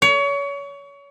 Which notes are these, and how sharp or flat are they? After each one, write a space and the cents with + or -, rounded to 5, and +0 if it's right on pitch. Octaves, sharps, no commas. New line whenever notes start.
C#5 +30